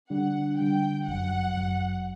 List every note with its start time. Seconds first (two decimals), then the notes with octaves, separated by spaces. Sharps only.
0.10 D3 G3 D4 F#5
0.58 D3 G3 D4 G5
1.06 G1 F#2 F#3 F#5
1.55 G1 F#2 F#3